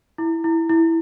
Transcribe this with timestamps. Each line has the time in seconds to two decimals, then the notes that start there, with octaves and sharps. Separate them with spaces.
0.18 E4
0.44 E4
0.70 E4